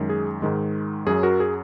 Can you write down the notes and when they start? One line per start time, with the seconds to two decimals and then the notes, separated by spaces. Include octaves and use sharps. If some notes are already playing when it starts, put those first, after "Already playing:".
Already playing: F#2 D#3 G#3
0.09 G#4
0.42 G#2 D#3 G#3
1.07 F#2 F#3 G#4
1.23 F#4 A#4
1.40 G#4